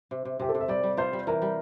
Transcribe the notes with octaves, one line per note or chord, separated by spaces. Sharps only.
C3
C3
C3 G4
A4
C3
E5
G3 D5
G3
F4 C5
G3
E3 A#4
G3